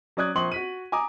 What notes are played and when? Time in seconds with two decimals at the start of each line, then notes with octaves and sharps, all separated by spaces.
0.17 F#3 C#4 D5 D#6 F#6 G#6
0.36 A#1 C5 C6 C#6 D#6 F#7
0.52 F#4 B6 D#7
0.92 G#5 A#5 D6 D#6